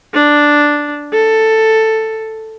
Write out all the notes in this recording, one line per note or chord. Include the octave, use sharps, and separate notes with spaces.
D4
A4